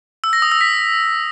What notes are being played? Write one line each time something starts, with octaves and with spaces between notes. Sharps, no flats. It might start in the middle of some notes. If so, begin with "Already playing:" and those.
E6
A#6
D#6
E6
B6